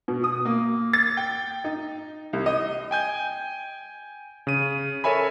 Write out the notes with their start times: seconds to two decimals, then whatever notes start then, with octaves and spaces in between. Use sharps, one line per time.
0.08 B2
0.24 D#6
0.45 A#3
0.93 A6
1.17 G5
1.64 D#4
2.33 C2
2.46 D#5
2.91 G5 G#5 G6
4.47 C#3 D#7
5.04 A4 A#4 C#5 E5 G#5 B5